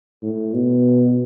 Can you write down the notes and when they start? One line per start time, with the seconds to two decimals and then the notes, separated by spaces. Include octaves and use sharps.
0.23 A2
0.54 B2